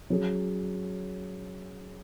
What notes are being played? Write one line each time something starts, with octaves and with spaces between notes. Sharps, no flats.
F#3 C#4 G#4